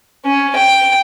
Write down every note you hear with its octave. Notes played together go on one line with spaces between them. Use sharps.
C#4
G5